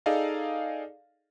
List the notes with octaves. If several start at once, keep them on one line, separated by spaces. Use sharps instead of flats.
D#4 G#4 A4 D5 D#5 F5